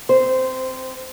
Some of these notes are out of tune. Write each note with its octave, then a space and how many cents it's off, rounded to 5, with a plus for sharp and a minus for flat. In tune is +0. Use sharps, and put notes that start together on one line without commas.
C4 +0 C5 -15